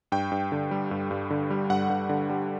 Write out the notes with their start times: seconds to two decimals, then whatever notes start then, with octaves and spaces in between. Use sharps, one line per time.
0.12 G2 G5
0.32 G2
0.52 D3
0.71 G3
0.91 G2
1.11 G2
1.30 D3
1.50 G3
1.70 G2 F#5
1.90 G2
2.09 D3
2.30 G3